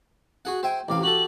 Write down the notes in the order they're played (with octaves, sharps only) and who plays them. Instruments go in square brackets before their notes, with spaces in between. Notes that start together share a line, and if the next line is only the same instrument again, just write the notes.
[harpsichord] F#4 G#4 F#5
[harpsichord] C5 E5 G#5 [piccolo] G5
[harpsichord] A1 C3 F5 [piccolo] D6
[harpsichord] F#4 G4 A4 [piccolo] F#7